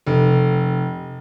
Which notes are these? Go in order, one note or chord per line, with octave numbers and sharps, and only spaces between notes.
F1